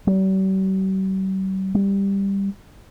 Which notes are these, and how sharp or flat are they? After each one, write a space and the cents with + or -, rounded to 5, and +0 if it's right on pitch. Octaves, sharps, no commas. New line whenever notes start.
G3 -45
G3 +10